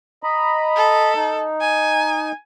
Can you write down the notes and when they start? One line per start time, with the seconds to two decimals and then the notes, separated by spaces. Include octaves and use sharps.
0.23 D#5 A#5 B5
0.76 A4
1.15 D#4
1.61 G#5